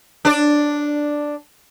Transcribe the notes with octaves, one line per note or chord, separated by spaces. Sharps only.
D4 D5